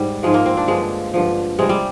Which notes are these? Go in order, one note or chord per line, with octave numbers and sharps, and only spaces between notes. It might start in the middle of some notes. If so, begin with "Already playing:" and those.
Already playing: G#2 G3
G#2 F3 G#3
A#3
C4
D4
G2 D3 F3 G#3
G2 D3 F3
C3 G3 G#3
G3